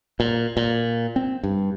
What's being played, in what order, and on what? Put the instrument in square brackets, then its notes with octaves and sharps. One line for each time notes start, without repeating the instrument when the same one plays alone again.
[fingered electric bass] A#2
A#2
C4
G2